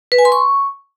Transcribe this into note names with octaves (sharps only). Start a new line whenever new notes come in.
B4
G#5
C6
C#6